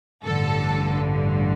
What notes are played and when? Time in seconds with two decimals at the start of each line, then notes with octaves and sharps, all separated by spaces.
0.24 A1 G2 D3 A4